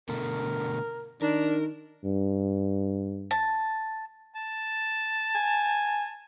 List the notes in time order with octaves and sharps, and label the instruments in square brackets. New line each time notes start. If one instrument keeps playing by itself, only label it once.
[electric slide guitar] B2 D3 A3 [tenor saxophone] A#4
[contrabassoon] D#3 [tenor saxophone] D4 [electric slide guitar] A#4
[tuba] G2
[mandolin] A5
[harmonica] A5
[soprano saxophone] G#5